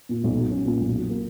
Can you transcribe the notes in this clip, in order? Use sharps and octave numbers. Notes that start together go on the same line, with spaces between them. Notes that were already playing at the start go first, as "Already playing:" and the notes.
A#2
B1
F#3
C#4
A#2
B1
F#3
A#3